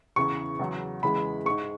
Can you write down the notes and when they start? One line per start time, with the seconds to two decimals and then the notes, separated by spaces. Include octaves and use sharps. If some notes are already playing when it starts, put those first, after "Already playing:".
0.16 E2 C#3 E3 C#6
0.59 E2 C#3 F#3
1.03 E2 C#3 E3 G#3 B5
1.46 G#3 C#6
1.49 G#2